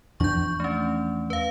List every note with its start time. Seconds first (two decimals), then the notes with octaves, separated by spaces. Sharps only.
0.20 E2 F3 D4 C#6 G6
0.60 A3 C#4
1.30 B4 F5